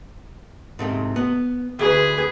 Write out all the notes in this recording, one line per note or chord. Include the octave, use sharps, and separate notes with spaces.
G#2 C3 A3
B3
D2 G#4 B4